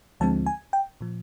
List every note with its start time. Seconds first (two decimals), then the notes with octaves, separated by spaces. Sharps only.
0.20 D2 D3 F3 G#3 C4 A5
0.46 G#5
0.73 G5
1.01 A#2 F3